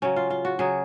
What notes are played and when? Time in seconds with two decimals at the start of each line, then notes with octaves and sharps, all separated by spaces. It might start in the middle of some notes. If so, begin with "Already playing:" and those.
0.02 C#3 F#3 C#4
0.16 F4
0.30 F4
0.45 F#4
0.59 C#3 F#3 G#4